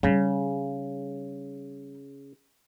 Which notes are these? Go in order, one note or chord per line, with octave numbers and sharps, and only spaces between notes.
C#3 G3 D#4